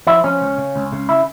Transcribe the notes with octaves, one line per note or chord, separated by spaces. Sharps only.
F3 E4
F3 C#4
C#2
C#3
C#2
C#3
E4